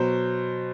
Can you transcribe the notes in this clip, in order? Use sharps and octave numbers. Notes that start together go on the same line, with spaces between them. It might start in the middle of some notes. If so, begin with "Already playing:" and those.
Already playing: B2 F#3 C5